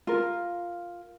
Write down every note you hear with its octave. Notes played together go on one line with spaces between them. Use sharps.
F4 A#4